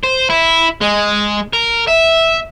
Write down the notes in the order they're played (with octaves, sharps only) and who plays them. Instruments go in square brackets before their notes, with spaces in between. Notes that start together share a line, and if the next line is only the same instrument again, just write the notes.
[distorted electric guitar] C5
E4
G#3
A#4
E5